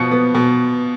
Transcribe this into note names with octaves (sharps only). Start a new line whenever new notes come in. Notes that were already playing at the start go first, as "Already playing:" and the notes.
Already playing: B2 F3 C#7
B3
B2